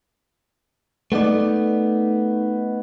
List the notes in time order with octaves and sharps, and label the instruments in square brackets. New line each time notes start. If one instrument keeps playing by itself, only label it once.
[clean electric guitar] A3 B3 D#4 D5